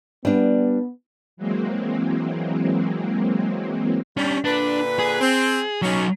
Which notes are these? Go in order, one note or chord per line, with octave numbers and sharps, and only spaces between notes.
G3 B3 D4
E3 F#3 G#3 A#3 C4
G3 C#4 D4
A#2 D3 D4 B4
G#4
C4
F#3 C#4 D#4